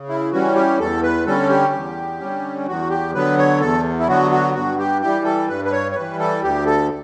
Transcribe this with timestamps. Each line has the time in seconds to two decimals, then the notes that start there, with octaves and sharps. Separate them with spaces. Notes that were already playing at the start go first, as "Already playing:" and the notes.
Already playing: C#3
0.09 E4
0.32 E3 G3 C#4 F#4
0.56 G4
0.79 E2 A4
1.03 B4
1.26 D3 G3 C#4 A4
1.49 G4
1.73 E2
2.20 D3 G3 C#4
2.66 E2 F#4
2.90 G4
3.14 D3 F#3 B3 B4
3.38 C#5
3.60 E2 A4
4.00 E4
4.08 D3 F#3 B3 F#4
4.31 F#4
4.54 G2 F#4
4.79 G4
5.02 E3 G3 G4
5.25 A4
5.48 G2 B4
5.65 B4
5.72 C#5
5.92 C#5
5.95 E3 G3 B4
6.19 A4
6.43 D2 G4
6.66 A4